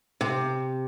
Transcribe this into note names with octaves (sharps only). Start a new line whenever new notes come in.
C3